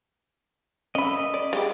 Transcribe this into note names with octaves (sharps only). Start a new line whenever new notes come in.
C#4 D#5 E5 B5
D5
G3 G#3 G4